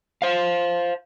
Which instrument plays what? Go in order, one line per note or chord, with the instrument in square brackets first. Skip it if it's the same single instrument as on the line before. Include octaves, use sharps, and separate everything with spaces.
[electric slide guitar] C5 F5